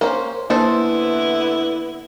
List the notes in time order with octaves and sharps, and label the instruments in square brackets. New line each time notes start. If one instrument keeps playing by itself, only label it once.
[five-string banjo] A#3 C#4 C5 [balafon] A#4
[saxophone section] D3 B3 E4 [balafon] A#3 [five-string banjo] G#4 A4 C5